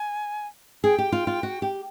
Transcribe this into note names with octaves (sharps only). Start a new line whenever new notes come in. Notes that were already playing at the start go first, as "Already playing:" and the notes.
Already playing: G#5
G#4 G5
G4
F4
F4
F#4
G4